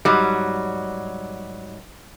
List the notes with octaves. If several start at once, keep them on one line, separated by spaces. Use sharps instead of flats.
G#2 F#3 G3